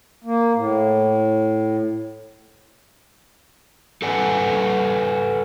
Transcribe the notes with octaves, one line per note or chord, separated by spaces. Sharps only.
A#3
A2
A4 B4 D5 F#5 G#5